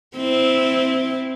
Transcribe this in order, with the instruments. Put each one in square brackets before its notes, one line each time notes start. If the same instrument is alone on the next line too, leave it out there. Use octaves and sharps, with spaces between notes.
[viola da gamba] C4 E4